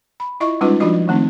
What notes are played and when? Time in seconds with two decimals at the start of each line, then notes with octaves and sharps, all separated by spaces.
0.20 B5
0.40 E4 F4 D#5 E5 C#6
0.61 G3 G#3 C#4 D#4 F4 B4
0.80 F3 D4 D#4 F4 F#4 D#5
1.08 D#3 A3 C4 D#4